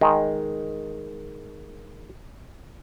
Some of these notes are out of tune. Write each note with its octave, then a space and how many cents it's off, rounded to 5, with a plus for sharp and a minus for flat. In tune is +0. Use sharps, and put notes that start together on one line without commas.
D#3 +0 G#3 +0